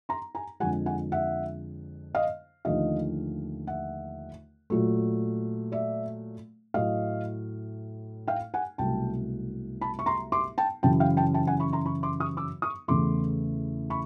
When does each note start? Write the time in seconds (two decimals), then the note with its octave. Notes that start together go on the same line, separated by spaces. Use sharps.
0.09 A#5 C6
0.35 G#5 A#5
0.60 F2 D3 F3 G#3 F#5 G#5
0.86 F#5 G#5
1.12 E5 F#5
2.15 D#5 F5
2.65 D#2 D3 F3 A3 D#5 F5
3.67 E5 F#5
4.70 A#2 F#3 A3
5.72 D5 E5
6.74 A2 F#3 A3 D#5 F5
8.28 F5 G5
8.54 F#5 G#5
8.78 C2 B2 F#3 A3 G5 A5
9.81 A5 B5
9.99 C#6
10.06 A#5 C6
10.32 C6 D6
10.58 G5 A5
10.83 F#2 C#3 E3 G5 A5
11.00 F5 G5
11.17 G5 A5
11.34 G5 A5
11.47 F#5 G#5
11.60 B5 C#6
11.73 A#5 C6
11.85 B5 C#6
12.03 C6 D6
12.20 C#6 D#6
12.37 D6 E6
12.62 C#6 D#6
12.88 E2 C#3 E3 A3 C6 D6
13.90 B5 C#6